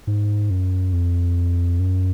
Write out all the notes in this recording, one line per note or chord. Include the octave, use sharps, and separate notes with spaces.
G#2
F#2
F2
F#2